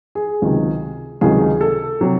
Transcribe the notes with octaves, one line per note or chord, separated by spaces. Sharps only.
G#4
C#2 C3 D#3 F#3
C#2 C3 D#3 F#3 G#4
A4
C3 F#3